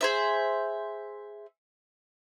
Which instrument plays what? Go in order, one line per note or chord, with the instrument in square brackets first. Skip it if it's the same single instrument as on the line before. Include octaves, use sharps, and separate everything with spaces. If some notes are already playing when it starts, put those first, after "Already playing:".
[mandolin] G#4 C5 E5